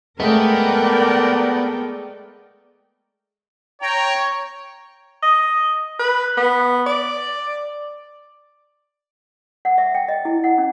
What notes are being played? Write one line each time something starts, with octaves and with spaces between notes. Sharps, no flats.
G#3 A3 B3 A4 A#4 D5 G5
C#5 G5 A#5
D#5
B4
B3
D5
F#5
E5
G5
D#5
E4
F#5
C#4